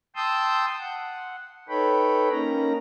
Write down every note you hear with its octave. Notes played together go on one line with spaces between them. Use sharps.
G5 A5 C6 D#6 E6 G6
F#5
D#4 A4 B4 C#5 G5 B5
A#3 C#4 D#4 A#5